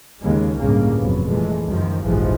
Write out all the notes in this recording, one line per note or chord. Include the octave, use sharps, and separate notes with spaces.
D#2 C#3 G#3
G1 C#2 A2 C#3 A#3
F1 F#3 B3
A#2 E3 G#3 A3
C#2 F#2 D#3 F3
F1 A#1 G#2 E3 F3 G#3